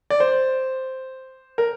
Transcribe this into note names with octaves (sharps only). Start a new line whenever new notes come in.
D5
C5
A#4